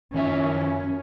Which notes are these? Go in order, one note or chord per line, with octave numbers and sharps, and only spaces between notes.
F#2 D#3 F3 C#4 E5